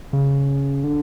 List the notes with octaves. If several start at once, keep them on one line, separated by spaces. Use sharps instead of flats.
C#3
D3